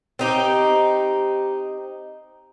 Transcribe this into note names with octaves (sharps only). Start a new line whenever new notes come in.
C4 D#4 G4